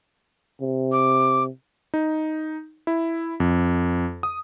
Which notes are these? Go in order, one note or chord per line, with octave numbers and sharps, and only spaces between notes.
C3
D6
D#4
E4
F2
D#6